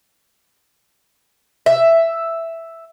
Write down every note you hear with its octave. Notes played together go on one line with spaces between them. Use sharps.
E5